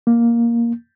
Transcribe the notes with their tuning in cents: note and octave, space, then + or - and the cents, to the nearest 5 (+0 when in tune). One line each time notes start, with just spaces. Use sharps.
A#3 +5